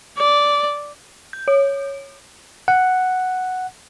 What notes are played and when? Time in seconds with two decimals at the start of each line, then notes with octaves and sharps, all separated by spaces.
0.18 D5
1.33 G6
1.48 C#5
2.68 F#5